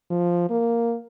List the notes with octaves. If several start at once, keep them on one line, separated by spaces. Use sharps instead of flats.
F3
A#3